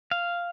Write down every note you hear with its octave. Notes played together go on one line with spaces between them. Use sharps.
F5